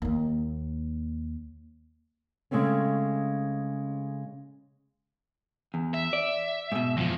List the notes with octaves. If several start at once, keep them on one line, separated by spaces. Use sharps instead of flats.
D#2 A#3
C#3 G#3 A3 C4 C#4
E2
E5
D5
G#2 B2
E2 F3